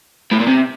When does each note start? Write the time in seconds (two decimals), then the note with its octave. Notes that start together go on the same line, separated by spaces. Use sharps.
0.31 A2
0.40 A#2
0.47 C3